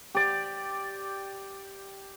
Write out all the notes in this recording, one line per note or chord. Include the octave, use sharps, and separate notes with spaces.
G4 D5